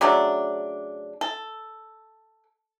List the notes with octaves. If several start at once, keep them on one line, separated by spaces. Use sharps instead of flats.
C#3 F#3 A3 D4
A4